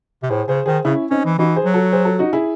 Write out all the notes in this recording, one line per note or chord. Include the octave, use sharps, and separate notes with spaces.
C3
A2 G#4 C5
C#3 G#4 C5
D#3 G#4 C5
C#3 C#4 E4
C4 C#4 D#4
E3
E3 D#4 F#4
G#4 C5
F#3
F#4 A4
G#4 C5
F#4 A4
D#4 F#4
E4 G#4